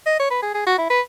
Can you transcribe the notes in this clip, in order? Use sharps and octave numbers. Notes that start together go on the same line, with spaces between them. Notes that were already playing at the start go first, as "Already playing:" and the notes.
D#5
C#5
B4
G#4
G#4
F#4
E4
B4